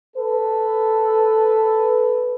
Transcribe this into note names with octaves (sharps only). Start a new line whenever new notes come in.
A4 B4